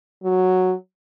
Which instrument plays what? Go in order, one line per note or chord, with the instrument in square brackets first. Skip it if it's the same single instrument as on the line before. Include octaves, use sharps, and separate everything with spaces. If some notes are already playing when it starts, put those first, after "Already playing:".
[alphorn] F#3